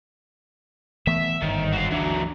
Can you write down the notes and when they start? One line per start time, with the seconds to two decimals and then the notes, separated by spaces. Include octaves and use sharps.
1.07 E3 A3 B3 E5
1.42 G1 G#2 D#3
1.73 F#4 F5
1.91 D2 E3 F#3 D4